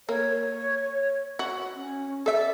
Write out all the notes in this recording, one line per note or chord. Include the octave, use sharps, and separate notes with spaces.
A#3 C#5
F#4
C#4
A4 D5 E5